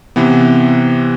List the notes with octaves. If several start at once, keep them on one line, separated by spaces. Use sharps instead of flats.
C3 E3 B3